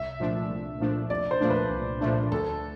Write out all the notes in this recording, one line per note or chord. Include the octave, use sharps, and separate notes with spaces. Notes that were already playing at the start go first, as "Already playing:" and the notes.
Already playing: C2 E5
A#2 F3 A3 D4
C2
A#2 F3 A3 D4
C2 D5
C5
A#2 F3 A3 D4
B4
C2
A#2 F3 A3 D4
D2 A4